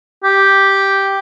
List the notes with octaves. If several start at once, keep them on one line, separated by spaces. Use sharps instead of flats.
G4